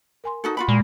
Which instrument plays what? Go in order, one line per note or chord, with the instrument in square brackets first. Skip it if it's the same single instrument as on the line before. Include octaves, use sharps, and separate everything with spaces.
[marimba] A#4 G#5 C6
[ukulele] D#4 F#4 A4
F4 F#4 B5
[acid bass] A#2 [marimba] G#3